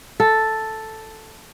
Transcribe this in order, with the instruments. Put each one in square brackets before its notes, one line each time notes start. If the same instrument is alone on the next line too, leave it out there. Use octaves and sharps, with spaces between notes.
[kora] A4